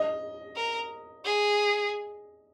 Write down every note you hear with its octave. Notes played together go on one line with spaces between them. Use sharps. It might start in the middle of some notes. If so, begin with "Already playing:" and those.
Already playing: D#5
A#4
G#4